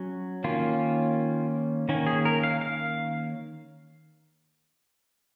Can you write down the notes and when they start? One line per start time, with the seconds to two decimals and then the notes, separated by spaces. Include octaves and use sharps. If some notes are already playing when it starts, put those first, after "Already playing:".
Already playing: F#3 C#4
0.44 D#3 A#3 C#4 F4
1.89 D#3 A#3 C#4
2.07 G#4
2.25 A#4
2.43 F5
2.61 F5